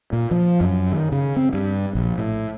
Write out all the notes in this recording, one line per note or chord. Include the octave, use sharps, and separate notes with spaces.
A#2
F3
F#2
D#3
C#3
C4
G2
A#1
A2